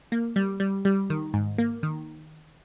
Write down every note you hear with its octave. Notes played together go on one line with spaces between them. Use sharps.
A#3
G3
G3
G3
D#3
G#2
A#3
D#3